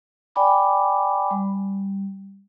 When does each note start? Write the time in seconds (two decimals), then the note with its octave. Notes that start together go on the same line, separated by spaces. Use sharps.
0.36 D5 G5 G#5 B5 D6
1.31 G3